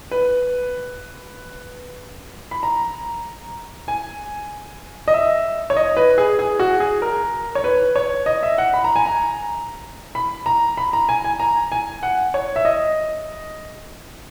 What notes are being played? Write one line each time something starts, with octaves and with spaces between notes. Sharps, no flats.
B4
B5
A#5
G#5
D#5
E5
C#5
D#5
B4
G#4
G#4
F#4
G#4
A#4
C#5
B4
C#5
D#5
E5
F#5
B5
A#5
G#5
A#5
B5
A#5
B5
A#5
G#5
G#5
A#5
G#5
F#5
C#5
E5
D#5